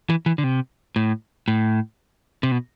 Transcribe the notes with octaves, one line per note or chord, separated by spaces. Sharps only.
E3
E3
D3
C3
A2
A2
C3
B2